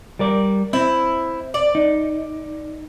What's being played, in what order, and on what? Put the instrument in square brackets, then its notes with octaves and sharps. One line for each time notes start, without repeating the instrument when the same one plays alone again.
[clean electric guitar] G3 A#4 D5
[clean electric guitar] C4 [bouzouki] E4
[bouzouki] D5
[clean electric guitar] D#4